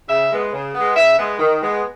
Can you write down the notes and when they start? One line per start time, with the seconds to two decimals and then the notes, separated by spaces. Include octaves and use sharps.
0.09 C#3 E5
0.31 G#3 B3
0.53 C#3
0.74 G#3 B3
0.96 C#3 E5
1.18 G#3 B3
1.39 D#3
1.61 G#3 B3